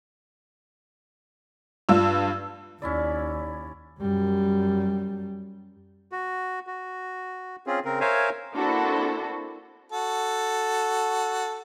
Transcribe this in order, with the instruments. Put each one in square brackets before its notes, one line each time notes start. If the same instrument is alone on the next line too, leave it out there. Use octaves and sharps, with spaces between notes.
[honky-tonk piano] G2 D4 F4 E6
[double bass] D#2 [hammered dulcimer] C#4 E4 D5
[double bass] F#2 G3
[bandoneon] F#4
F#4
C4 C#4 F4 G#4
C#3 C4 A#4
A#4 C5 C#5 E5 F5 G#5
[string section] A#3 C4 D4 E4 F#4 A4
[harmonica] F#4 A4